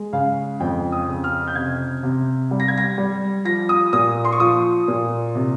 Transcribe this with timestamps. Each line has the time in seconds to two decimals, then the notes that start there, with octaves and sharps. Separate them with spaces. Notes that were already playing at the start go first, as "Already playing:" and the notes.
Already playing: G#3
0.13 C#3 F5
0.60 F2 G5
0.92 D#6
1.08 C#3
1.24 F6
1.47 G6
1.55 C3 G#6
2.03 C3
2.51 G3
2.60 A#6
2.68 G#6
2.78 A#6
2.98 G3
3.45 F3 A#6
3.69 D#6
3.93 A#2 D#6
4.25 C6
4.32 C#6
4.40 F3 D#6
4.88 A#2
5.35 C3